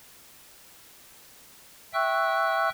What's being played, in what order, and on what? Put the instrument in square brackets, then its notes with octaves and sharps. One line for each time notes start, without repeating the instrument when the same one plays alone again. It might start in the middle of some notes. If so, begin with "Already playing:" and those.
[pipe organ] E5 G5 C#6 E6 F#6